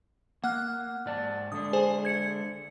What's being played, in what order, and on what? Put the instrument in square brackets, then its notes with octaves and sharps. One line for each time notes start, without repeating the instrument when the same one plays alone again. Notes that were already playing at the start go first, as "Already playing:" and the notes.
[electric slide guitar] A#3 [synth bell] F#5 F6 F#6
[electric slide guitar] G#2 D5 A5
[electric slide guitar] D3 G#3 D4 [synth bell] D#6
[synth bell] G#4 C5 G#5
G#6 C#7